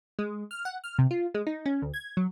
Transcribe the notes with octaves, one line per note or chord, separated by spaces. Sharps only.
G#3
F6
F#5
F6
C3
F4
G#3
D#4
C#4
D2
G#6
F#3